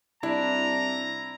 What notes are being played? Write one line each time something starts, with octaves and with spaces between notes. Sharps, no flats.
C2 D4 E4 A#5